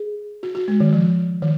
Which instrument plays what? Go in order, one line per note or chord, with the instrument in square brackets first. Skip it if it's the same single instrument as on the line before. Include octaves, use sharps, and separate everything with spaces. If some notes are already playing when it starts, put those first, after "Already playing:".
Already playing: [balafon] G#4
F#4
F#4
G#3
D#3
F3
D#3